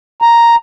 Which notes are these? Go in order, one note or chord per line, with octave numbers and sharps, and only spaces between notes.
A#5